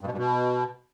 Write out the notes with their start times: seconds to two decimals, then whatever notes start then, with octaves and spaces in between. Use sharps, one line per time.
0.01 G2
0.07 B2
0.12 G2
0.18 B2